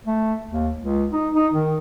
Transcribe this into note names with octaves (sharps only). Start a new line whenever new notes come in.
A3
D#2
C#2
D#4
D#4
D#3